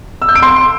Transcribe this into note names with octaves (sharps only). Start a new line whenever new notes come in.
E6
G6
D7
C6